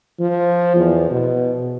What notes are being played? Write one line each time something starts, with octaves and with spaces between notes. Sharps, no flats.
F3
E2
B2